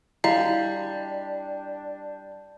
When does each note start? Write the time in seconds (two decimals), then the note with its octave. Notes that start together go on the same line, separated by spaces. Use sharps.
0.24 G3 D4 E4 F#4 D#5 F5